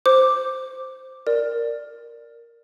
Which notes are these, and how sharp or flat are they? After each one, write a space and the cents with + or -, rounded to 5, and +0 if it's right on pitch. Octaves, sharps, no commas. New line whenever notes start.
C5 -5 D6 +0
A#4 +0 D5 +0